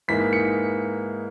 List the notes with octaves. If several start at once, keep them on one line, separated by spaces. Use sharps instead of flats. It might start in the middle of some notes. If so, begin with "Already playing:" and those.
G#2 E3 A#3 D#4 B6
C#7